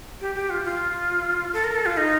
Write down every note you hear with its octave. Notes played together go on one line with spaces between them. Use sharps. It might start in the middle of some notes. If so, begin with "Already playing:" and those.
G4
G4
F4
F4
A4
A#4
A4
F4
D#4